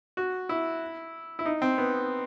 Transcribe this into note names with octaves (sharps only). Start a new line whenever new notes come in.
F#4
E4
E4
D#4
C4
B3